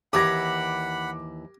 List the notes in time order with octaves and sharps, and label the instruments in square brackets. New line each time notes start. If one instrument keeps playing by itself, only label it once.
[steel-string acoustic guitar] D#2 E3 [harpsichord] G4 [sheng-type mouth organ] F#5 B5 [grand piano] D6 G#6 A#6